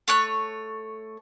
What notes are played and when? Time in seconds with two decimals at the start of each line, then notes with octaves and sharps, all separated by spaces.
0.08 A3 C#5 F#6